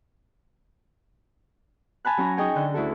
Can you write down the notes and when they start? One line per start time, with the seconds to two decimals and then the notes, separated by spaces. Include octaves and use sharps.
2.05 G#5 A5 B5 F#6
2.17 F#3 C#4 F#4 A#5
2.37 D#4 G#4 D#5 G5 G#5 C#6
2.56 D3 F#6 G6
2.74 D2 E4 F#4 A4